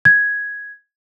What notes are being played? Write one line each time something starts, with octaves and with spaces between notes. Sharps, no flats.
G#6